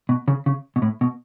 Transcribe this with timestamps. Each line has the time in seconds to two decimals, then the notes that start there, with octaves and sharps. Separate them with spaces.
0.09 B2
0.28 C#3
0.46 C#3
0.76 B2
0.82 A2
1.01 B2